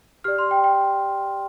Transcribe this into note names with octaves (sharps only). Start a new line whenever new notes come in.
G4 D5 F6
C6
G5
G5